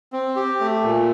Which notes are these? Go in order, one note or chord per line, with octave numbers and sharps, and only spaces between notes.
C4
G4
A3
A#2